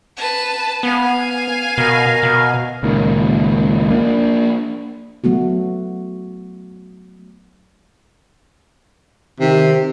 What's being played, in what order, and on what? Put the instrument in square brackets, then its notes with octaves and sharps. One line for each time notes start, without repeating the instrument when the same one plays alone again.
[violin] B4 A5
[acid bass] B3 [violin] F5 G#5
[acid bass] B2 [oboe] A#4
[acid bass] B2
[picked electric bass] C#2 A#2 D#3
A#3 D4
[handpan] F#3 A3 B3 F#4
[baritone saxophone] C3 [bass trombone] D#3